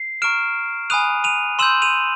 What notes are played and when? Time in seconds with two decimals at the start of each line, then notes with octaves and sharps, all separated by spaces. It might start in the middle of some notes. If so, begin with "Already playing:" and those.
Already playing: C7
0.22 A#5 C#6 F6 D7 E7
0.90 G#5 B5 D#6 F#6 D#7 F7
1.24 D#7 F7
1.59 C6 E6 G6 E7 F#7
1.82 D#7 F7